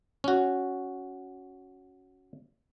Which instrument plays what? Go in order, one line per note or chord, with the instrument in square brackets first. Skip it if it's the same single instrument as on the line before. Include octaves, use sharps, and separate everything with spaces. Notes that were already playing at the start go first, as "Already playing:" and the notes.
[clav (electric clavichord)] C#4 F#4